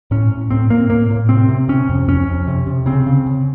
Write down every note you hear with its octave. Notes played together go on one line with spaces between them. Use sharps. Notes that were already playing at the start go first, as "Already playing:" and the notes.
A2 C#4
A2
A2 C4
A2 A#3
A2 A#3
A2
C3 C4
C3
C3 C#4
F2
F2 C#4
F2
C3
C3
C#3 C4
C#3
C#3